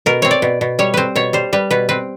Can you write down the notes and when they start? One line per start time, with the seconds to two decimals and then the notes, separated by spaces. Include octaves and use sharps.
0.06 B2 A#4
0.22 C4 C#5
0.31 D5
0.42 B2
0.61 B2
0.79 G3 C#5
0.94 C4 B4 C5
1.16 B2 C#5
1.33 G3 C5
1.53 G3 B4
1.71 B2 B4
1.89 C4 B4